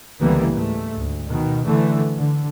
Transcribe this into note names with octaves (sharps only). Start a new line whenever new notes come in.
C#2 D3 E3 G3 A#3 B3
G#2 A3
D2
B2 D#3
D3 E3 A3
D3